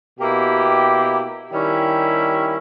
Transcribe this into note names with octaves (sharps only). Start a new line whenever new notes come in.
B2 A#3 E4 G4
D#3 G3 C#4 E4 G4